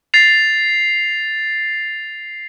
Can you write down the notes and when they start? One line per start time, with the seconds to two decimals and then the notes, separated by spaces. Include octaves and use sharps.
0.14 A6 C7 F7